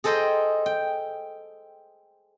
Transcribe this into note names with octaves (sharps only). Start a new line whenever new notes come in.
G#4 A4 C5 D#5 G5 C6
G5